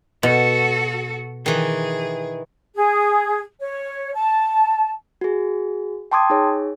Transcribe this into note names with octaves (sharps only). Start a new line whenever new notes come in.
B2 F#4 A4
D#3 E3 G#4
G#4
C#5
A5
F#4 G#4
G5 A5 C6 D6 D#6 G#6
D#4 G#4 C#5